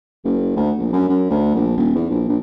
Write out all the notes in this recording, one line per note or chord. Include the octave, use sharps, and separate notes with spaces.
F#1
D2
A#1
F#2
F#2
D2
A#1
D#1
E2
A#1
A#1